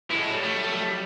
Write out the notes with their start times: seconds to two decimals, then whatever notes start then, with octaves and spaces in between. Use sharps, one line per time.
0.11 E3 G#3 E4 A4
0.29 F#3 G3
0.44 A3